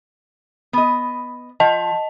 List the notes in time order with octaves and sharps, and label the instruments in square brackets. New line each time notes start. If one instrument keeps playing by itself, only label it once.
[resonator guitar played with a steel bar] B3 D#5
[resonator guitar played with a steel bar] F3 [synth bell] D#5 A5